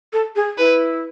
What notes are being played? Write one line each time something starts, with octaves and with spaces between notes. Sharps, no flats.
A4
G#4
E4 B4